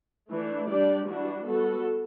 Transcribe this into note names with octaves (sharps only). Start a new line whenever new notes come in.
E3 A3 D4
G3 D4 G4 D5
E3 G3 D4 F#4
G3 B3 F#4 A4